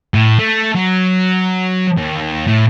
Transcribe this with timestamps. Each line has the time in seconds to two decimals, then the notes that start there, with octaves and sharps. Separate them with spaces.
0.14 A2
0.39 A3
0.75 F#3
1.97 D#2
2.47 A2